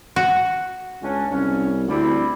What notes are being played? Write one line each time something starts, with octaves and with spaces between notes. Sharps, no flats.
F#4
C#2 C#4 D4
C2 C#4
D2 G3 C4 E4